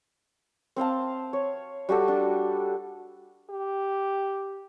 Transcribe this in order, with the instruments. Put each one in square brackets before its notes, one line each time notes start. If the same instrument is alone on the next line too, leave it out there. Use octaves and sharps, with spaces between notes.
[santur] C4 C5 F5 A5
C#5
G3 F#4 G4 A4
D4
[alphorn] G4